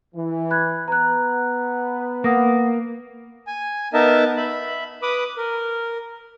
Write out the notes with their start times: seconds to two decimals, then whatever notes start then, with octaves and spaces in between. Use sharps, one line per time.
0.15 E3
0.50 B5 F#6 G#6
0.88 B3 B4 A#5 F#6
2.24 A#3 F#5 D#6 A#6
3.47 G#5
3.94 B3 D#4 A#4 D#5 E5 A5
4.37 E5 B5
5.02 B4 B5 D6 D#6
5.37 A#4